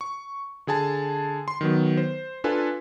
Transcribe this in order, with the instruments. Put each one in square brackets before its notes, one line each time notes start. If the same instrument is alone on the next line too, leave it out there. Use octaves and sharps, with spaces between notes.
[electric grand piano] C#6
D3 G#4 G#5 A5
C6
D#3 F#3 B3
C5
D4 F4 A4 B4 G#5